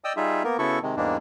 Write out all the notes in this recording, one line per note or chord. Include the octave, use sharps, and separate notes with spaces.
D5 D#5 G5 D#6 E6
G3 D#4 F4 G#4 E5
A#3 B3 A#4
C#3 B3 E4 F#4 A4 C#6
C3 D#3 G#3
E2 G#2 G3 G#3 A#3 D4